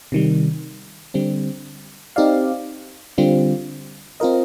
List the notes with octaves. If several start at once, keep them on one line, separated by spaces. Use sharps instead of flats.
C3 D#3 G3
D3 G3 C4
C4 D#4 G4 D5 F5
D3 G3 C4 F4
C4 F4 A#4 D#5